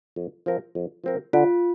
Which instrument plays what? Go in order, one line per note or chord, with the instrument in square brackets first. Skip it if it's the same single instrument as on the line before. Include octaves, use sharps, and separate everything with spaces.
[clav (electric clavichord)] F2
F3 C4 A#4
F2
F3 C4 A#4
[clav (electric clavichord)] D3 [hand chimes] F4